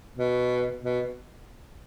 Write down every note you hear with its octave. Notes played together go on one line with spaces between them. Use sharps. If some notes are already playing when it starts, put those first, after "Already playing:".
B2
B2